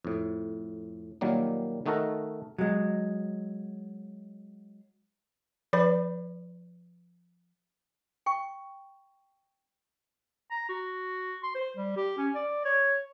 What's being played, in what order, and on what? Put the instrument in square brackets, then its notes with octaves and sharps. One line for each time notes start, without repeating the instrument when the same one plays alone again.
[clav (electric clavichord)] F2 A2
A#2 D#3 F#3 G3 A#3
D#3 A3 D#4 F#4 A4 A#4
[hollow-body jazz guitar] F#3 G#3
[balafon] F3 B4 D5 B5
[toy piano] G5 C#6
[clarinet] A#5
F#4
C6
C5
G3
G4
C#4
D5
C#5